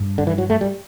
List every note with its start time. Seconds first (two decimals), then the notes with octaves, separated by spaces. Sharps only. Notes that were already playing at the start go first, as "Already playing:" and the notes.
Already playing: G2
0.18 D3
0.27 E3
0.38 F#3
0.50 A3
0.61 G3